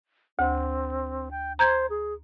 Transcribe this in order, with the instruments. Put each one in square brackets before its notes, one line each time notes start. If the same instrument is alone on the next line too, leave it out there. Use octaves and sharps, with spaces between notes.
[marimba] D2 [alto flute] C4
[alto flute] G5
[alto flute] C5 [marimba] A#5 G6 G#6
[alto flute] G#4